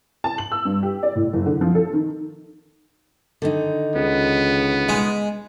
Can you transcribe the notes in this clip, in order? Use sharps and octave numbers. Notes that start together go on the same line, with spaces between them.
A5
F#7
E6
G2
G4
D5
A2
F#1
D3
F3
A4
D#3
D3 D#3 D#4
C#2 B3
G#3